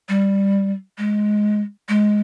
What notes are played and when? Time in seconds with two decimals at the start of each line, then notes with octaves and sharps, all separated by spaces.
0.09 G3
0.98 G#3
1.89 G#3